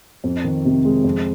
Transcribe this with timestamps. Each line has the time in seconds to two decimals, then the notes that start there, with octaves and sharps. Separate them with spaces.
0.24 F2
0.44 D#3
0.65 C3
0.85 G#3
1.04 F2